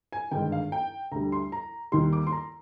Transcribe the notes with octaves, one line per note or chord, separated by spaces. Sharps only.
G#5
G#1 G2 D3 G#3 G5
F5
G5
D2 D3 G3 A#5
C6
A#5
D#2 D#3 G3 C6
D6
C6
A#5